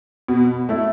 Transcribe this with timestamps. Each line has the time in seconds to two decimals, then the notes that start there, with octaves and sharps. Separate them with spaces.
0.28 B2
0.69 A3 E4